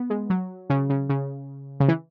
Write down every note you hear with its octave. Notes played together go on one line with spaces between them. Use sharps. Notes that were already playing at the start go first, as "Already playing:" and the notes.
Already playing: B3
G#3
F#3
C#3
C#3
C#3
C#3
E3